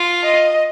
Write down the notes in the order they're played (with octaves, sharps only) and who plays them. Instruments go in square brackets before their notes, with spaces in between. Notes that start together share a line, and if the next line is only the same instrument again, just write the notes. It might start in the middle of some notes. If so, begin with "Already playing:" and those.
Already playing: [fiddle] F4
[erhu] D#5